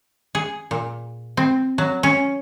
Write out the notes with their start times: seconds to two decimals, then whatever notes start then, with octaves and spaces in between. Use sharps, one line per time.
0.35 G#4
0.71 A#2
1.37 C4
1.78 F#3
2.03 C#4